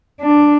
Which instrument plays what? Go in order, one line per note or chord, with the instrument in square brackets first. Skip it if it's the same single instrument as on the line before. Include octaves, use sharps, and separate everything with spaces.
[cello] D4